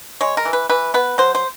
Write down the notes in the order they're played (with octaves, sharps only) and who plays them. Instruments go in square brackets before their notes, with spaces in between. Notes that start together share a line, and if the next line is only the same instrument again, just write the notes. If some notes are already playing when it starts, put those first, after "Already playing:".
[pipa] G#3 C#5
A#4
E3
B4
E3 B4
B3 B4
F#3 C5
C5